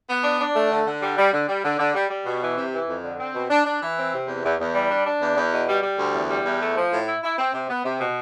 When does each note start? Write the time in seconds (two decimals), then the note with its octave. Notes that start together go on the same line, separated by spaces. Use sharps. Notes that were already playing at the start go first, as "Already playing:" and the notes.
0.09 B3
0.23 D4
0.40 D4
0.55 A3
0.70 D3
0.86 D3
1.02 G3
1.17 G3
1.32 D3
1.48 G3
1.64 D3
1.79 D3
1.94 G3
2.10 G3
2.25 B2
2.42 E3
2.56 C3
2.73 E3
2.89 F2
3.03 D3
3.19 C4
3.34 B2
3.50 D4
3.65 D4
3.82 E3
3.97 C4
4.13 C3
4.27 E2
4.44 E2
4.59 E2
4.74 G3
4.89 D4
5.06 D4
5.20 E2
5.36 E2
5.53 B2
5.68 G3
5.83 G3
5.98 D2
6.13 E2
6.29 G3
6.45 E2
6.61 A3
6.76 F3
6.92 A2
7.07 E4
7.23 E4
7.38 C4
7.53 C3
7.69 B3
7.84 C3
8.00 B2